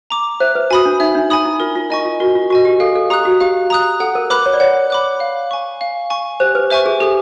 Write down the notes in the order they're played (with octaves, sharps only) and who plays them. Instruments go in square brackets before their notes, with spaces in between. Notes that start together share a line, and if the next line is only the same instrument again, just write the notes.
[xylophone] A#5 D6
[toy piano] C5 [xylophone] E5
[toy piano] B4
[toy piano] F#4 [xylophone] G#5 B5 D#6
[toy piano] D4
[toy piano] D#4 [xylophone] E5
[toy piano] D4
[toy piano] D#4 [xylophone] G#5 B5 D#6
[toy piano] E4
[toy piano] F4 [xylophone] A#4
[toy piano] F4
[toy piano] E4 [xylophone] D#5 G#5 C#6
[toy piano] F4
[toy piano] F#4 [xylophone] A#4
[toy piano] F4
[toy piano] F#4 [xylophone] D#5 G#5 C#6
[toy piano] G4
[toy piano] A4 [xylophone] F5
[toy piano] A4
[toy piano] G4 [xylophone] A#5 D#6 F#6
[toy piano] F#4
[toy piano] G4 [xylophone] F5
[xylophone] A#5 D#6 F#6
[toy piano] A4 [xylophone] F#5
[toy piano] A#4
[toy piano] B4 [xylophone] B5 D6 F#6
[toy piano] C#5
D5
[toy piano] C#5 [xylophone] F#5
[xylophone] B5 D6 F#6
F5
G#5 C#6
F5
G#5 C#6
[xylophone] G4 [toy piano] C5
[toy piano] B4
[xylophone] C5 E5 G#5 C#6
[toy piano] G#4
[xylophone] G4 [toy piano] A4